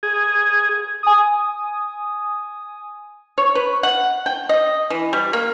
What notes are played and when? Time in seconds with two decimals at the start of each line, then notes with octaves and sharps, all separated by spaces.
0.03 G#4
1.03 G#5 D#6
3.38 C#5
3.55 B4
3.83 F#5
4.26 G5
4.49 D#5
4.90 E3
5.13 G3
5.33 A#3